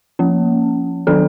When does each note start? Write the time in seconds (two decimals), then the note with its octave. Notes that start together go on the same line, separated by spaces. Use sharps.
0.19 F3 A#3 C#4
1.07 D#3 F#3 B3 D4 A4